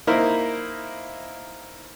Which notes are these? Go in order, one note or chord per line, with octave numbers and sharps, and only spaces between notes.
A#3 D#4 E4 A#4 C5